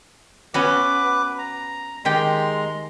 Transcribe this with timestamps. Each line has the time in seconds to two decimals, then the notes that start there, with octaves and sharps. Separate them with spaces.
0.54 B3 C#4 F#4 B4 D6
1.38 A#5
2.05 D#3 G#3 G4 G5 A#5 C6